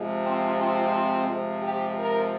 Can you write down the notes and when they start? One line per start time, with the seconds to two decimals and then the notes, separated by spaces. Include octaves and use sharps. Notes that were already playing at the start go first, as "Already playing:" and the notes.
Already playing: C3 F3 G#3
0.22 C4
0.57 C4
1.27 C3 F3 G#3
1.62 G4
1.97 A#4